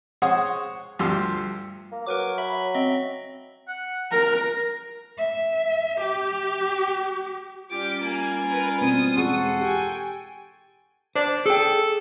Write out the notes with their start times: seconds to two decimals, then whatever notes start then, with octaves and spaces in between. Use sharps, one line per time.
0.22 G#3 C5 C#5 F#5 D#6
0.99 D2 G2 F3 G4 C6 E6
1.92 A#3
2.07 F#3 A#4 B4 D6
2.38 E5 B5
2.74 C4 D#5 E5
3.68 F#5
4.12 A#4 A#5
5.18 E5
6.00 G4
7.71 G3 C#4 F4 G4 D6
8.02 A#3 G#5
8.47 A#4 B4
8.81 B2 C4 D#6
9.17 E1 C4 G#4 A4 F#5 C6 C#6
9.61 G4 G5 G#5
11.16 D4 C5
11.46 G#4 A4 G5